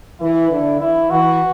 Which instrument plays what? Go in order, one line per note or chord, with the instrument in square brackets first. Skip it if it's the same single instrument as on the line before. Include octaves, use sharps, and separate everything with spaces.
[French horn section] E3 [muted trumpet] E4
[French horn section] D3
[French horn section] E3 [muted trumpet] E4
[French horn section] E3 [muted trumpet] F#4